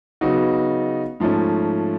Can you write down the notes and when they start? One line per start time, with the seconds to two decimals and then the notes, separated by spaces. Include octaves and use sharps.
0.21 C#3 F#3 B3 D#4 F#4
1.20 G#2 F3 A3 C#4